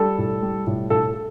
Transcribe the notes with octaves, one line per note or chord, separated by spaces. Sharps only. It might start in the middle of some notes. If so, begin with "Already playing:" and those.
Already playing: G3 A4
A2
G3
A2
A2 A4